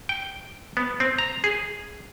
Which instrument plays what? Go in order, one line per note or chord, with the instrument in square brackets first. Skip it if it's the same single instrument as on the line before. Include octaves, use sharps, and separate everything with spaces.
[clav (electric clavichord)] G5
B3
C4
A#5
G#4